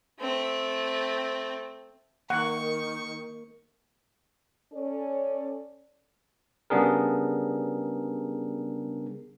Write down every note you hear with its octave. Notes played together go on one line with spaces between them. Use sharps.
A3 C4
D#3 A#3 F#5 C#6
C#4 A4 D5
C#3 G3 B3 D4 G#4 A#4